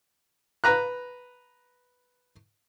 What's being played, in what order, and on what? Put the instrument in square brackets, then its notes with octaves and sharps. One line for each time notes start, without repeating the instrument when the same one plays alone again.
[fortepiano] B4 A#5 F#6